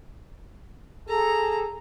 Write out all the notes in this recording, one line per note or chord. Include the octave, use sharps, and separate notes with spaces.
G#4 A4 A#5